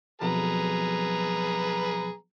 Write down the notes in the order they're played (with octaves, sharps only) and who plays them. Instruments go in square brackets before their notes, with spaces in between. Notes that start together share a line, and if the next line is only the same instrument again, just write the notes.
[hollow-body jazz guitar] B1 F2 [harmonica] G#4 B4 A#5